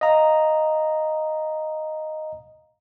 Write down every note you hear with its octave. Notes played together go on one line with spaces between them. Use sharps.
D#5 F5 A#5